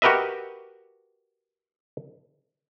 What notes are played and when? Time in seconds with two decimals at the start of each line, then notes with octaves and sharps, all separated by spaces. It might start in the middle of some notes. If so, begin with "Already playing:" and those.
0.02 F#4 G4 A#4 B4 D#5 E5